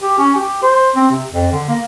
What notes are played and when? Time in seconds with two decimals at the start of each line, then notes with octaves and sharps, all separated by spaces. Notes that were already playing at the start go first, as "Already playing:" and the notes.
0.01 G4
0.19 C#4
0.36 G4
0.62 C5
0.95 C4
1.11 C3
1.33 F2
1.52 D3
1.69 A#3